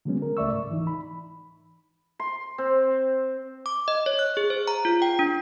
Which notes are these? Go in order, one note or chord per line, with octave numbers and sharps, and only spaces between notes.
D3 F#3 G#3 B3 C#4
A#4
C#2 A3 D5 E5 C#6 E6
G#2
E3 D#4
B5
C6
C4
D6
D#5
C#5
F#6
G#4
C5
A#5
F4
G5
D4